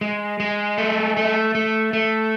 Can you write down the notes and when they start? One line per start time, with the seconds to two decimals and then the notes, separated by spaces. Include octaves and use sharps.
0.01 G#3
0.40 G#3
0.78 A3
1.17 A3
1.55 A3
1.93 A3